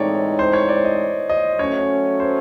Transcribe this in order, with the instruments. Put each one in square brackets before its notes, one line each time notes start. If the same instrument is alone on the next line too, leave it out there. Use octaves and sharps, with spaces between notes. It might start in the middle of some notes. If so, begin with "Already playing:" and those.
Already playing: [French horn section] A2 E3 G#3 C4 D#4 [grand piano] C#5 D5
[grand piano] C5
C#5
D5
D#5
D#5
[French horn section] F#3 A3 C#4 [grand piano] C#5
[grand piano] C5